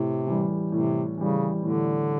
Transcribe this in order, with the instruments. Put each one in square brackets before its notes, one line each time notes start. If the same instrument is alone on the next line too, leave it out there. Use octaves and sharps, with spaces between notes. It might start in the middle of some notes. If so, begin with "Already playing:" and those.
Already playing: [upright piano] A2 [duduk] C3
[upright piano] E3 G3
[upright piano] A2 [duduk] C3
[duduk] C#3 [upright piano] E3 G3
[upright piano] A2 [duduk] D3